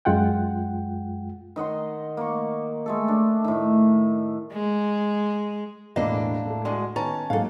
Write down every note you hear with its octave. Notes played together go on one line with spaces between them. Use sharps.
F#2 G#3 F4 F#5 G5
D#3 D#5 F#5 C6
A#3 C#6
G#3 A3 A4
D4
A2 D#3
G#3
E1 E2 A2 A#3 D4 D#5
A2 A3
D2 D3 G#3
D#3 B3 C#4 A5 A#5
G#2 F#3 A#3 A4 F5